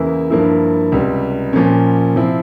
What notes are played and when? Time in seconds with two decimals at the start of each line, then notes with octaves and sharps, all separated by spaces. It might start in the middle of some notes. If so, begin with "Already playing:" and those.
Already playing: E2 C#3 E3 A#3 E4
0.30 G2 F3 A#3 E4
0.92 C#2 C3 G3
1.53 A#2 F3 A#3 C#4
2.15 C3 F3 C4 E4